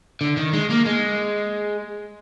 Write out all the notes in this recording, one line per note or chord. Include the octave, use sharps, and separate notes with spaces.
D3
D#3
G#3
A#3
G#3